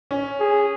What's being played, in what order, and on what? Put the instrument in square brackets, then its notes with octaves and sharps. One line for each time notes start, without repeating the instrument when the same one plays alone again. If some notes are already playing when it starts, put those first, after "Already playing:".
[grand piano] C#4
[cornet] G#4